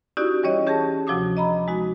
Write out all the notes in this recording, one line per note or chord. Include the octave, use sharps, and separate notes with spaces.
C#4 D#4 E4 F#4 G4 D5
E3 G3 C#4 C#5 D#5
C#4 G4 G#4 A5 A#6
D2 C3 F3 F#4 D6 D#6
D#5 A#5 B5
G#3 D#4 F#4